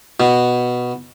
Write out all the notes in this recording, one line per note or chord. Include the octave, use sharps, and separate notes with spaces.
B2